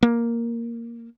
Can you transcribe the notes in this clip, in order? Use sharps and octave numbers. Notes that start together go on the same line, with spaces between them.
A#3